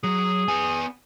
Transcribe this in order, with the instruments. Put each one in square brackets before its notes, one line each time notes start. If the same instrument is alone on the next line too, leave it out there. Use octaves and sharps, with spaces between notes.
[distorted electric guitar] F#3 [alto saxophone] G#4
[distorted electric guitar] B3 G#5